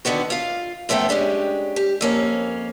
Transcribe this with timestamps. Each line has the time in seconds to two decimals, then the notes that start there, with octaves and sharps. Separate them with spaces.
0.05 D3 D#3 B3 F#4
0.30 F4 F5
0.89 F#2 F3 A3 B3 G5
1.09 G#3 C#4 D4 G4
1.76 G4
2.01 F2 A#3 C#4